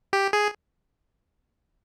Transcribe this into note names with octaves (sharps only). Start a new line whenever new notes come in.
G4
G#4